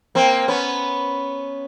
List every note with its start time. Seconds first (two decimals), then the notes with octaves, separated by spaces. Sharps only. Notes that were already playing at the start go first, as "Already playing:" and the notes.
0.15 A#3 C4
0.48 B3 C#4